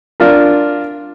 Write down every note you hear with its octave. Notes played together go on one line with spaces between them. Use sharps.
D4 F4 A#4